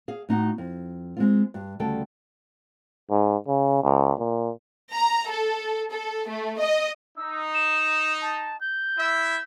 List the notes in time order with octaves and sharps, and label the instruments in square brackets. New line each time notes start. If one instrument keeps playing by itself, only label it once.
[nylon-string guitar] G#4 F5
A2 D#4 F#4
F2
G#3 C4 F4
G2
D2 C#3 G3 A4 G5
[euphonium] G#2
C#3
C#2
A#2
[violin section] A#5
A4
A4
A3
D#5
[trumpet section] D#4 [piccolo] E6
[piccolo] E7
A5
G6
[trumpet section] E4 E5